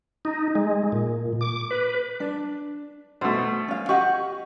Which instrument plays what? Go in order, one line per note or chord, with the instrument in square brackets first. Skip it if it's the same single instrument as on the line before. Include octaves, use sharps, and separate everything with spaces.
[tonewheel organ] D#4
G#3
A#2
D6
B4
[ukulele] D4
[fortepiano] B2 A3 [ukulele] C5
[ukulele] C#4 F5
[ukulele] G4 D#5 F#5 [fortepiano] C#6